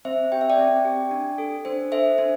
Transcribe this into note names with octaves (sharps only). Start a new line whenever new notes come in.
C4 C5 E5
G4 G5
E5
D5 G5
C4
G4
D4
A4
D4 C5
A4 C5 E5
D4 C5